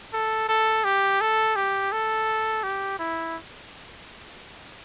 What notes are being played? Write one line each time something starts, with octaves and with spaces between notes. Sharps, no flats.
A4
A4
G4
A4
G4
A4
G4
E4